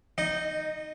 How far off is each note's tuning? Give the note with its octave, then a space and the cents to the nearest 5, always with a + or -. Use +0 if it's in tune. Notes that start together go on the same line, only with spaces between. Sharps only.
D#4 +0 D#5 -25